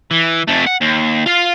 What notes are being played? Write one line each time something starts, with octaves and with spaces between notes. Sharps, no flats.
E3
F2 A3
F#5
D#2
F4 F5